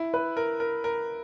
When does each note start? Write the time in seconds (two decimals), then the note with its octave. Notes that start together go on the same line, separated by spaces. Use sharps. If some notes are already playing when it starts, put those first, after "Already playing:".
Already playing: E4
0.14 B4
0.37 A#4
0.60 A#4
0.84 A#4